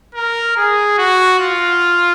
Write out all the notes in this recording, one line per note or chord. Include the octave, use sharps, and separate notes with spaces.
A#4
G#4
F#4
F4